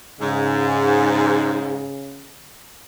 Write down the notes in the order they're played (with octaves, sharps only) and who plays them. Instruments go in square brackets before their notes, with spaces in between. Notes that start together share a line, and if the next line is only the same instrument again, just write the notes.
[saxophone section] G#2 [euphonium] C#3